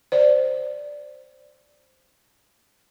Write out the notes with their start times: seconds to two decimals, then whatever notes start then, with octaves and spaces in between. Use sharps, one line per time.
0.12 C5 D5